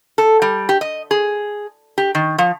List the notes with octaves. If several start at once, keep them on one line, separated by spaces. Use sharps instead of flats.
A4
G3
G4
D#5
G#4
G4
D#3
F3